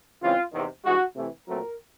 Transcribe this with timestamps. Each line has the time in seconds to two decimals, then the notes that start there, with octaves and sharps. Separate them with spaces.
0.22 C#3 E3 G#3 C4 F4
0.53 E2 C3 D#3
0.84 G2 E3 G#3 F#4
1.16 C3 E3 A3
1.46 A#2 F#3 A3 C4 A#4